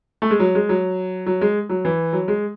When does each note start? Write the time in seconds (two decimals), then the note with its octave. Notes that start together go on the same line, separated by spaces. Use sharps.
0.22 A3
0.31 G#3
0.40 F#3
0.55 G#3
0.69 F#3
1.26 F#3
1.41 G#3
1.69 F#3
1.85 E3
2.13 F#3
2.28 G#3